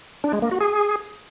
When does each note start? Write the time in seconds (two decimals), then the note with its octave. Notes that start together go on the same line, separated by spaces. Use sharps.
0.24 D4
0.33 G#3
0.42 A#3
0.51 F#4
0.61 G#4